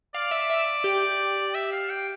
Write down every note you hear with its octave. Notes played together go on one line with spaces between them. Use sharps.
D5 F5
E5
E5
G4
E5
F5
G5